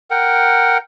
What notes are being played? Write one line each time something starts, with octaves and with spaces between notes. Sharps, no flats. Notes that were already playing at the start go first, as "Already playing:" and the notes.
A#4 F#5 G5